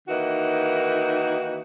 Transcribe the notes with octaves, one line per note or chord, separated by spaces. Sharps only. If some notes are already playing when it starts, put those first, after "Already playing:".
D#3 E3 A#3 D#4 F#4